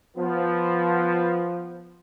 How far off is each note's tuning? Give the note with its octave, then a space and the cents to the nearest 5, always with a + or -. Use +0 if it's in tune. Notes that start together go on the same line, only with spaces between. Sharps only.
F3 +0 B3 +0